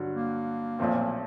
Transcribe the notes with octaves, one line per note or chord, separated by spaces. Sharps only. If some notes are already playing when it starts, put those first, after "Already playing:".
Already playing: G2 D3 F#3
A#3
B1 A#2 F3 A3 C4